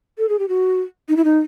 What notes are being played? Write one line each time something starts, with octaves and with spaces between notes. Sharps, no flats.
A4
G#4
G4
F#4
D#4
E4
D#4